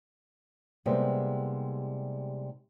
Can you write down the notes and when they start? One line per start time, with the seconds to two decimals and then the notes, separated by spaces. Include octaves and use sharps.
0.86 C3 G3 G#3 A#3 B3 D#4